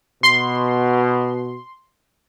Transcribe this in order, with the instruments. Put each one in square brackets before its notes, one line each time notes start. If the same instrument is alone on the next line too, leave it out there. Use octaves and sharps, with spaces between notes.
[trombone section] B2 [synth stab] C6